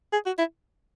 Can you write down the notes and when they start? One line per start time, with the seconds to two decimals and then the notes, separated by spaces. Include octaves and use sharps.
0.13 G#4
0.26 F#4
0.38 E4